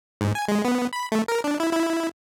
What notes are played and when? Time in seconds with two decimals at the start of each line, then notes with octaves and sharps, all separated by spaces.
0.21 G#2
0.35 G#5
0.48 G#3
0.65 B3
0.93 B5
1.12 A3
1.28 A#4
1.44 D4
1.60 E4
1.73 E4